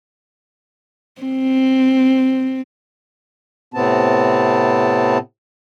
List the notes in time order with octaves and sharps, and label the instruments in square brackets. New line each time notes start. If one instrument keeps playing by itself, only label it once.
[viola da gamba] C4
[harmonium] A2 C3 B3 C4 A5